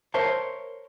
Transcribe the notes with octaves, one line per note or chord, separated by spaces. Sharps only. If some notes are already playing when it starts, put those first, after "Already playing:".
A#4 C5 C#5 E5 A5